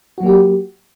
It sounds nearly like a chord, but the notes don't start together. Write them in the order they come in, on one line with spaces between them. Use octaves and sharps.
F#4 F#3 A#3 G4